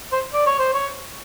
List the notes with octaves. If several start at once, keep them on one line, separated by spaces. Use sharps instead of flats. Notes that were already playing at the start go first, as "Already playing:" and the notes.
C5
D5
C#5
C5
C#5